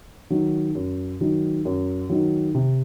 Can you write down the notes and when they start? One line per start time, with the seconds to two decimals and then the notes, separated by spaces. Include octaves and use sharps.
0.30 D#3 F#3
0.75 F#2
1.21 D#3 F#3
1.65 F#2
2.10 D#3 F#3
2.55 C3